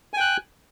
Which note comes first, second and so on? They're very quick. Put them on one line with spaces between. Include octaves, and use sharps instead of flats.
G#5 G5 F#6